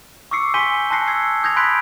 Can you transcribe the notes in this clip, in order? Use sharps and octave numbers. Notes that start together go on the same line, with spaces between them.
C#6 D6 E6 C7 C#7
G#5 C6 G6 B6 D#7 G7
A5 C6 F#6 A#6 C7 C#7
E6 G#6 C7
D#6 G6 G#6 A#6 F7
B5 C6 F#6 G6 B6 D7